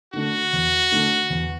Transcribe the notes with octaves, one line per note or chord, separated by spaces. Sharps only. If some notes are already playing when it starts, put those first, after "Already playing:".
D3 A3 D4 F#4
E2
D3 A3 D4
E2